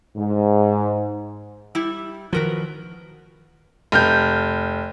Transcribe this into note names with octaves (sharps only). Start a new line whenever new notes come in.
G#2
G3 E4
D#3 F3 F#4 A#4 B4
F1 F6 G6